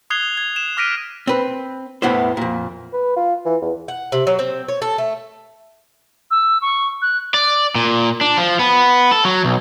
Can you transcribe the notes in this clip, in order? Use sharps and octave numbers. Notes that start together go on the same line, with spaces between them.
D#6 F#6 G#6 C7 F7 G7
G#6
E7
D6 F6 A#6 B6 D7 D#7
C4 B4
E2 A2 E3 B3 E4 C5
F2 A#2
B4
F4
E3
E2
F#5
C3
F#3
C4
C#5
A4
A3
E6
C#6
F#6
D5
A#2
D4
F3
B3
A4
F#3
B1